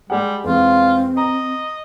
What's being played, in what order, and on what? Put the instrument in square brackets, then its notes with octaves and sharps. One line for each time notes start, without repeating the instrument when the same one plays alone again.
[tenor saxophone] G3 [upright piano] G#3 G#4 F#5
[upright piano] E2 G#3 [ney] C4 [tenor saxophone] F4
[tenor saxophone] D#5 [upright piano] A#5